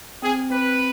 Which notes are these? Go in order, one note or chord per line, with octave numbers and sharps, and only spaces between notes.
C4 G#4
C4 B4